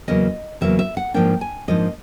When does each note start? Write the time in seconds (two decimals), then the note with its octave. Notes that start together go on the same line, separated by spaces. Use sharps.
0.08 E2 C#3 F#3 A#3 D#5
0.61 E2 C#3 F#3 A#3 E5
0.79 E5
0.97 F#5
1.14 G#2 F3 A#3 D4 G5
1.41 G#5
1.68 G#2 F3 A#3 D4 D#5